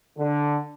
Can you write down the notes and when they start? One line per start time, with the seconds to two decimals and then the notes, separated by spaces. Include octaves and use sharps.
0.18 D3